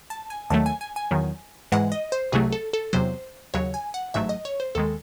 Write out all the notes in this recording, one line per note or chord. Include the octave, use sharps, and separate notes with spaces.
A5
G#5
D#2 D#3 F#3 A3 A5
G#5
G#5
G#5
E2 D#3 F#3
G#2 E3 G#3 F#5
D#5
C5
C2 C3 F#3 A3 G#4
A4
A4
E2 C3 F#3 C5
D#2 C#3 F#3 C#5
G#5
F#5
A1 G#2 F#3 A3 E5
D#5
C#5
C5
D#2 D#3 G#3 A4